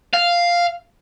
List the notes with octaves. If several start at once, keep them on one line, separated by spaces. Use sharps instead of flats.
F5